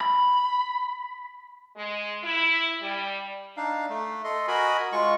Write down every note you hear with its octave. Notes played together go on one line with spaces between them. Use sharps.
B5
G#3
E4
G3
D4 D#4 F5
A3
A4 D#5 C6
F#4 A#4 D#5 G#5 B5
G#3 F4 C#6